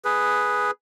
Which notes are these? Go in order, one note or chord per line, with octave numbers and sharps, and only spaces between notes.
G#4 B4